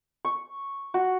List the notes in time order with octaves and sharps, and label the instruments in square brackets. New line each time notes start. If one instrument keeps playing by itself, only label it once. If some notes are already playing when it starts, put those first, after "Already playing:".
[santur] C#6
F#4